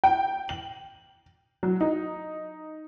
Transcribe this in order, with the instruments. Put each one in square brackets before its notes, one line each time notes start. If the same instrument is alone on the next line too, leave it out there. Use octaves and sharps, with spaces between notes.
[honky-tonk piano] G5
F#7
F#3
D#4